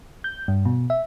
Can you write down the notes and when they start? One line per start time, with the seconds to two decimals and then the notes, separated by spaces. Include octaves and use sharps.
0.24 G6
0.48 G2
0.65 B2
0.90 E5